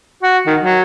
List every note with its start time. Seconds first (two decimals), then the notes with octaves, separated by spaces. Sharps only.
0.23 F#4
0.46 D#3
0.61 F#3